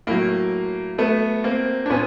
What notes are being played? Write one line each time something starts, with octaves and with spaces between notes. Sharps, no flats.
A2 F#3 A#3
A3 B3
A#3 C4
D4
A#2 B3 C#4